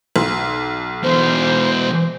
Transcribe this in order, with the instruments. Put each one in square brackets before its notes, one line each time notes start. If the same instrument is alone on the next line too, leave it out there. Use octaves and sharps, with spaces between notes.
[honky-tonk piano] B1 C6
[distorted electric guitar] B2 E3 [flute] C5